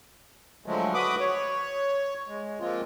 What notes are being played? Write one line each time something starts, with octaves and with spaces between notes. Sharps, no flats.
D3 F3 F#3 G#3 A3
F#4 B4 B5 D6 D#6
C#5
G#3
F3 G#3 A#3 C4 F4